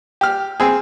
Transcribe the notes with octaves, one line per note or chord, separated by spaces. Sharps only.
G4 F6
C4 G#4